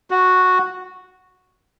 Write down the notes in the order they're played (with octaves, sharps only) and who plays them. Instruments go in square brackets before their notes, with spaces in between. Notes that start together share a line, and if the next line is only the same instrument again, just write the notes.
[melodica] F#4